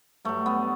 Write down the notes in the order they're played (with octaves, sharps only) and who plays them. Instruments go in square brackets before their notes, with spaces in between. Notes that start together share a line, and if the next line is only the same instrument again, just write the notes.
[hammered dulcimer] G2 F#3 A3
B3